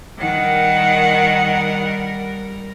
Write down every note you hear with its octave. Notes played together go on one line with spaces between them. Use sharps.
D#3 G3 A#4 F#5